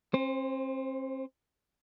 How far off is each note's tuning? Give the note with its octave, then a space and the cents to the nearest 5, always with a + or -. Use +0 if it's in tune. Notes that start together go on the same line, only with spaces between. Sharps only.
C4 +40 C5 +0